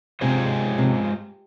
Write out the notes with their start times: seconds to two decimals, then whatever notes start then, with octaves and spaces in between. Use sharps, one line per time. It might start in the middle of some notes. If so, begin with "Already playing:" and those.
0.21 C3 G#3 F4 G#4 C5
0.78 C3